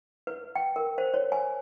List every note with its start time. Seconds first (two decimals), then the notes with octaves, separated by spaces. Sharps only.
0.27 B4
0.55 G5
0.76 A#4
0.98 C5
1.14 C#5
1.32 G#5